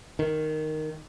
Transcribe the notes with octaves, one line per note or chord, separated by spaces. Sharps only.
D#3